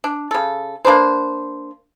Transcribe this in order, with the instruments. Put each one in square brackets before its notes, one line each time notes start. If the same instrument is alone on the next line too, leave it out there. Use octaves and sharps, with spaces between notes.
[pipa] D4
C#3 A4
A#3 D4 B4 C5